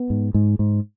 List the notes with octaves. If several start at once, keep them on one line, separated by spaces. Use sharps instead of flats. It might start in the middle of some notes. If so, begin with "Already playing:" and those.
Already playing: B3
G#2
G#2
G#2